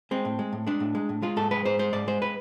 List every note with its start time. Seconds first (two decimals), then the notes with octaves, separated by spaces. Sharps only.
0.11 G#3 C4
0.25 A2
0.39 G#3
0.53 A2
0.67 G#3 D4
0.80 A2
0.95 G#3
1.09 A2
1.22 G#3 F4
1.36 G#2 A4
1.51 G#3 B4
1.65 G#2 C5
1.79 G#3 C5
1.93 G#2 D5
2.08 G#3 C5
2.22 B4